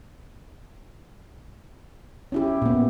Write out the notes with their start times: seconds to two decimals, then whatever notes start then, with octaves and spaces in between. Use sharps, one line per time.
2.32 C#4 E4 G4
2.62 A#2 B3